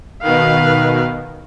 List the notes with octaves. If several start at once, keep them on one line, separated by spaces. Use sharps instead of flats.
B2 D#3 B4 F5